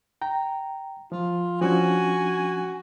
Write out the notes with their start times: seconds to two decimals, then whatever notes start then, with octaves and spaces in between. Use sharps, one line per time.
0.22 G5 A#5
1.12 F3 F4
1.62 F3 C#4 D4 F#4 G#5